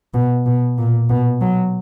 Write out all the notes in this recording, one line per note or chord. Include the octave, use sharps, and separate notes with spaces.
B2
B2
A#2
B2
F#3